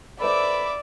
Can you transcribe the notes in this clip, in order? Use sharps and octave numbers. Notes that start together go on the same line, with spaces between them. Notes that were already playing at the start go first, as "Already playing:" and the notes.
A4 B4 C5 D5 E5 B5 D6